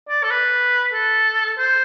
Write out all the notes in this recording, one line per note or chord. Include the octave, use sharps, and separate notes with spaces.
D5
A4
B4
A4
C5